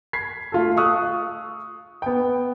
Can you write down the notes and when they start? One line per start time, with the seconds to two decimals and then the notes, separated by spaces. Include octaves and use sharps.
0.13 G#6 B6 C7
0.52 A3 F4 A4
0.77 F5 C#6 D#6 E6 F#6
2.02 B3 G5